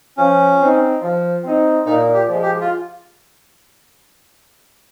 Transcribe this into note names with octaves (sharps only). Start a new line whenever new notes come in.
F3 C#4
C4 D#4
F3
C4 D#4
A#2 D#4
G4
F3 G#3
G4
F4